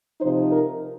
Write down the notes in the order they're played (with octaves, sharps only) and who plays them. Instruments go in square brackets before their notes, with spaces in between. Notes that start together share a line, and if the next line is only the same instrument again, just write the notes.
[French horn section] C3 F3 D#4 C5
A#4